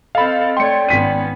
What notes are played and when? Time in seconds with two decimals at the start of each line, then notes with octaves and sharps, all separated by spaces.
0.15 C4 A4 D#5 F5 B5
0.57 A3 C#5 D5 G5 C6 C#7
0.89 G#1 B3 C#4 B6 D#7